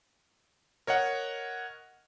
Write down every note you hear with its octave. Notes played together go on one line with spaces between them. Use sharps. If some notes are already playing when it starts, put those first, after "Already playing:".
A#4 C#5 D#5 F#5